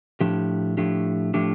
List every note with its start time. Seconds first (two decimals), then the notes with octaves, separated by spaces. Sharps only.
0.21 A2 F3 A3 D4 G4
0.77 A2 F3 A3 D4 G4
1.34 A2 F3 A3 D4 G4